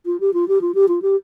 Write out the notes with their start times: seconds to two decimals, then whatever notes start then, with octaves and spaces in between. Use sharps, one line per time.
0.06 F4
0.20 G4
0.34 F4
0.48 G4
0.61 F4
0.74 G4
0.88 F4
1.02 G4